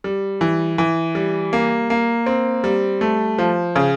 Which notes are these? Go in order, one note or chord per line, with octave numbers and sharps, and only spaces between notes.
G3
E3
E3
G3
A#3
A#3
C4
G3
A3
F3
C#3